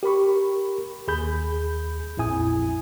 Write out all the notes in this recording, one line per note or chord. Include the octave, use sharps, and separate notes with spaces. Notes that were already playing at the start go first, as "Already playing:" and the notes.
G4 A#4 B5 C#6
D#2 G#4 B5 G6
A#1 F2 E4 G#5 D#6